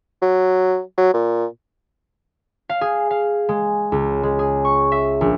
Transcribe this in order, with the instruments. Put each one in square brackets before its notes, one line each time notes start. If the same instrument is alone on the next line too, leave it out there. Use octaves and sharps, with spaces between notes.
[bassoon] F#3
F#3
A#2
[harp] F5
G#4
F5
G#3
C#2
G#3
G#4
C#6
E5
A#1